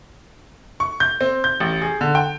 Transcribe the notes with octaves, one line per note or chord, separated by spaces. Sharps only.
C#6
G6
C4
G6
A1
G#4
D3
G5